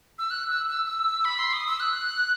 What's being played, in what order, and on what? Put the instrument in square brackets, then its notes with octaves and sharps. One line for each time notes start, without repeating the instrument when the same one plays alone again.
[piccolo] E6
F#6
E6
E6
E6
B5
C6
D#6
E6
F#6